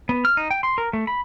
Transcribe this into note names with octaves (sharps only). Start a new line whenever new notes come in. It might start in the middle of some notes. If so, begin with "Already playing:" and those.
B3
F6
D#4
G5
C6
A#4
A3
B5